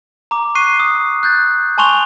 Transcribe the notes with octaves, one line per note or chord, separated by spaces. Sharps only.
A#5 D6
C#6 F#6 C7 D#7
D#6
F#6 G6 A6
G#5 A5 C6 C#6 F7 G7